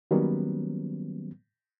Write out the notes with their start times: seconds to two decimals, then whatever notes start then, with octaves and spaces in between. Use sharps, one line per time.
0.11 D#3 F#3 G3 A#3 B3 C#4